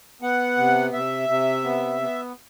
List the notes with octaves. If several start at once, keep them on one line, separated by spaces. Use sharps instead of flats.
B3 F#5
C3
C3 E5
C3
B3
B3